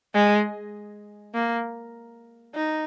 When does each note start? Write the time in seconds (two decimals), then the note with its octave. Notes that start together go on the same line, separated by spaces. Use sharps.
0.15 G#3
1.34 A#3
2.55 D#4